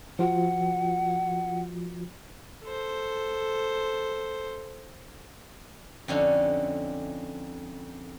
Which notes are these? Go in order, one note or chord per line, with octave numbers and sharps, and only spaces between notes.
F3 F4 F#4 F#5
A4 C5
F2 D3 C#4 D#4